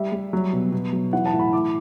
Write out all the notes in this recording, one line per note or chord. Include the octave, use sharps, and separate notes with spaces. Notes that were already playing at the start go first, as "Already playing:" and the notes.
Already playing: G3 E5
G3
F#3
B2
B2
F#3
E3 F#5
A5
A2
B5
A2 D6